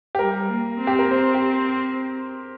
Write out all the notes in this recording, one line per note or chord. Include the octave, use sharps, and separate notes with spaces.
G4
G3 A#4
A#3
C4
G4
A#4
C4 C5
G4